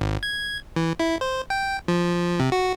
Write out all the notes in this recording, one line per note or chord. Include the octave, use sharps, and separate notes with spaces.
G#1
G#6
E3
E4
C5
G5
F3
C3
F#4